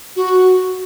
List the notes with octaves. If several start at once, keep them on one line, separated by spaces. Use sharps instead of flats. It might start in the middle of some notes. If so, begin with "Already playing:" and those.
F#4